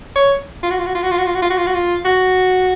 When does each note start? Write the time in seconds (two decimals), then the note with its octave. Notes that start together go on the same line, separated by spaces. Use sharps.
0.16 C#5
0.63 F4
0.70 F#4
0.79 F4
0.86 F#4
0.95 F4
1.03 F#4
1.11 F4
1.18 F#4
1.26 F4
1.34 F#4
1.42 F4
1.50 F#4
1.58 F4
1.66 F#4
1.74 F4
2.05 F#4